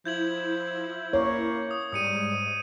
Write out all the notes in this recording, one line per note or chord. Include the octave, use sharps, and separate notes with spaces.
F3 E4 G6 G#6 F#7
A#3 C#5
D#6
G#2 G3 D#6 C#7 D#7